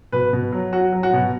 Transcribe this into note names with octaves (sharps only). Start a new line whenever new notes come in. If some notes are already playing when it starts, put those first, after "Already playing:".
B2 B4
B2
F#3
F#3 F#4
F#3
F#4
B2